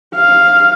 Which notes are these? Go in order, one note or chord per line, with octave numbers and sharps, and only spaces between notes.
F5